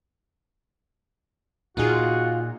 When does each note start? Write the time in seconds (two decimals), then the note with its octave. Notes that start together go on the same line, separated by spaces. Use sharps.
1.77 A#2 D#4 F4 F#4 G#4